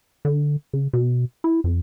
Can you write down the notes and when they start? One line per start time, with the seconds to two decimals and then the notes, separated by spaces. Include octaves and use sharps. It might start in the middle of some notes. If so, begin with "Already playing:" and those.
0.25 D3
0.73 C#3
0.93 B2
1.44 E4
1.64 F2